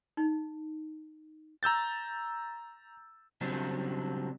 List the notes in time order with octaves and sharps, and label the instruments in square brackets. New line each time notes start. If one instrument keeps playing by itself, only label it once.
[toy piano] D#4
[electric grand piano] A#5 E6 G6 A6
[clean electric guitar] C#3 F#3 G3 C4 D4